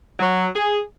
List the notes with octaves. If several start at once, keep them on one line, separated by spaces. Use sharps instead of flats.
F#3
G#4